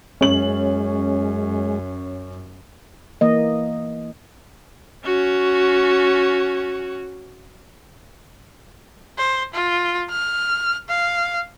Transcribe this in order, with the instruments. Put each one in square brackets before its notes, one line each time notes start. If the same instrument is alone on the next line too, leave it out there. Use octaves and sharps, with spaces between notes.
[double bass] F#2 [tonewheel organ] G#3 [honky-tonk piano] C#4 C#5 F#7
[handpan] E3 A#3 D#5
[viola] C#4 F#4
[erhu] C5
F4
F6
F5